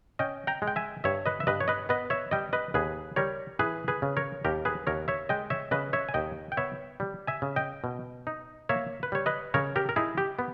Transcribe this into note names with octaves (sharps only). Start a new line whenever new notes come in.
C#4 D#5 G5
G5 A#5
G#3
G5
E5 G#5
G2 C#5 E5
B4 D#5
E5
G2 B4 D#5
C#5
B4 D#5
B3 B4 D#5
C#5 E5
G3 D#5 G5
B4 D#5
D#2 G#4 B4
G3 A#4 C#5
E3 G#4 B4
G#4 B4
C#3
A#4 C#5
D#2 G4 A#4
G#4 B4
D#2 A#4 C#5
C#5 E5
G#3 D#5 G5
C#5 E5
C#3 B4 D#5
C#5 E5
G#5
D#2 D#5 G5
G5
B3 C#5 E5
G3
E5 G#5
C#3
D#5 G5
B2
D#4
A#3 C#5 E5
B4
G3 C#5
B4 D#5
C#3 A#4 C#5
G4 A#4
A#4
D#4 E4 G#4
G4
B3